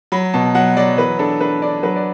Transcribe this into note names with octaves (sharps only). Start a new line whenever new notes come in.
F#3 B5
B2 A5
F#3 F#5
F#3 D5
E3 B4
D4 A4
D4 B4
D4 D5
F#3 B4
D5